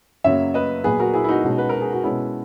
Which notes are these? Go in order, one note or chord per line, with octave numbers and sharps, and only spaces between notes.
F#2 C#3 F#3 A#3 C#5 E5
B4 D#5
A#2 F#3 B3 G#4 B4
F#4 A#4
E4 G#4
E4
D#4 F#4
B2 G#3 C#4
B4
A#4
G#4
F#4
B2 G#3 B3 C#4 E4